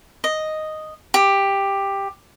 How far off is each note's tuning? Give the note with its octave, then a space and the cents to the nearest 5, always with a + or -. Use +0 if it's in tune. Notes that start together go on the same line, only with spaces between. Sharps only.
D#5 +0
G4 +10